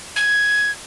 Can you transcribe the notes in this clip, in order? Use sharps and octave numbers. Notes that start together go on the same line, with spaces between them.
G#6